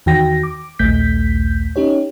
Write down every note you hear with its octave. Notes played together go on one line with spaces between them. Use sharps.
E2 D#3 F#4 G5 A#6
D6
A#1 D#2 A3 G6 B6
C#4 D#4 G4 C#5